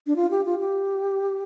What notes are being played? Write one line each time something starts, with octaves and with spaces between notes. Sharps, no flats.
D4
F4
G4
F4
G4